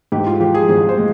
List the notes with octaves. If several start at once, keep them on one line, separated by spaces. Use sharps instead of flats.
G#2 G4
F4
F3 G4
G#4
G#1 G#4
C5
G#3